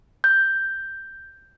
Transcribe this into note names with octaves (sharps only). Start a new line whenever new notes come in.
G6